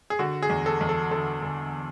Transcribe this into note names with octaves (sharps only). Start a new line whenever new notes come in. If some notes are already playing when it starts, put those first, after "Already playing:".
G#4
D3 F#4
G#4
E2
A4
E2
A4
D3 A4
D3